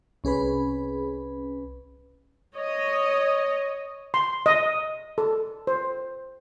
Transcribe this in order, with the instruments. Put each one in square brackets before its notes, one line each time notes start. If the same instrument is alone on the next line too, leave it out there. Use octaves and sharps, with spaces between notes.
[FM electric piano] C2 C#4 G#4 B4 B5
[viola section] C#5 D#5
[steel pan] C6
D#5
A4
C5